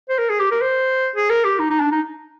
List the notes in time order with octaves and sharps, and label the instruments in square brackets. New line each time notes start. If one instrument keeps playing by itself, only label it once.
[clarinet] C5
A#4
G#4
G4
A#4
C5
G#4
A#4
G4
D#4
D#4
D4
D#4